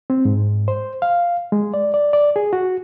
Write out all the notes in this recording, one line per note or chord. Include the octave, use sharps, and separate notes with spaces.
C4
G#2
C5
F5
G#3
D5
D5
D5
G#4
F#4